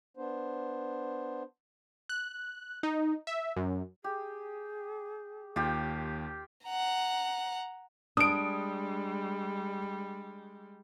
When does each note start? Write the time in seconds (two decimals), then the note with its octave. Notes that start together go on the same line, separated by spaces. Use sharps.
0.17 B3 D4 C5
2.09 F#6
2.83 D#4
3.27 E5
3.56 F#2
4.04 G4 G#4
5.56 D#2 F4 G4 G5
6.66 F#5 A#5
8.17 G3 G#3 D4 D#6 D7